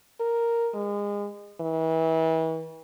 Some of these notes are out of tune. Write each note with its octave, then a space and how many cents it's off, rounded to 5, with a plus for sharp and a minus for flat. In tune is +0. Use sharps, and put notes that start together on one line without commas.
A#4 +0
G#3 -30
E3 -35